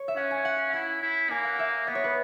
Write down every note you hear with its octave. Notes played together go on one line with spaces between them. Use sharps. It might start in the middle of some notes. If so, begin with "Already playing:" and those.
Already playing: C#5
E5
C#4 F#5
G#5
F#5
E4 F#5
E4
A#3 G#5
F#5
E5
B3 D#5
C#5
B4